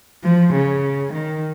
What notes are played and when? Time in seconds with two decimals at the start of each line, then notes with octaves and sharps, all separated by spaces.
0.23 F3
0.53 C#3
1.13 D#3